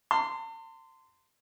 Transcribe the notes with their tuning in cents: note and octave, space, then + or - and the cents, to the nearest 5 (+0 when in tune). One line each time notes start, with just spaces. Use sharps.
A5 +45 C6 -15